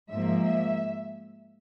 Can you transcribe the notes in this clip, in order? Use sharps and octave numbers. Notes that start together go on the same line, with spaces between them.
G#2 F3 A#3 E5
E5